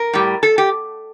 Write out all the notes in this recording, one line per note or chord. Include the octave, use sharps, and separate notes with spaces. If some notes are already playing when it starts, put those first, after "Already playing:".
Already playing: A#4
A2 G3
A4
G4